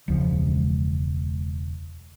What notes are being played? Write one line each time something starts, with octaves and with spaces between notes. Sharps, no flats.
E1 C#2 F3